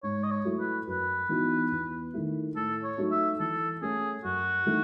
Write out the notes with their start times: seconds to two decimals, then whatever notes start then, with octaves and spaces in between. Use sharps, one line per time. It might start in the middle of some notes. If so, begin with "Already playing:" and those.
0.03 G#2 C#5
0.23 D#5
0.31 C#5
0.45 F#3 A3 E4
0.59 B4
0.87 F#2 B4
1.29 E3 B3 D#4 F#4
1.71 E2
2.14 D#3 A3 E4
2.55 A2 A4
2.84 C#5
2.98 F#3 A3 D#4 F#4
3.11 E5
3.40 E3 A4
3.81 A3 C#4 G#4
4.24 F#2 F#4
4.66 E3 A3 D#4